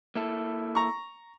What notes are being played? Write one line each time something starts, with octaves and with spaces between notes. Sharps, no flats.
A#3 E4 A4
A#5 C#6